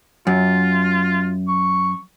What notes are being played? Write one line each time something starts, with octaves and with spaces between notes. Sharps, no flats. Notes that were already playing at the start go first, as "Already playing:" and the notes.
F#2 F4
C#6